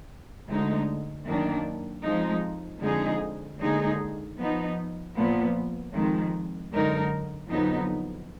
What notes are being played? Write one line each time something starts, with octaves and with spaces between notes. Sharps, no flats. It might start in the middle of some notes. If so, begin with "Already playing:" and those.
D2 D3 G#3 D#4
F#2 D#3 A#3 D4
F2 F3 G#3 D#4
F2 D3 G#3 D#4 G#4
D#2 D3 G#3 D#4 G#4
F3 B3 D#4
A#2 F3 B3
F2 D#3 G#3
F#2 D3 G#3 D#4 A#4
F2 D3 F#3 B3 D#4